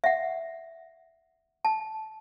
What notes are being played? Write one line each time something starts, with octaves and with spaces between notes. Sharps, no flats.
E5 F#5
A5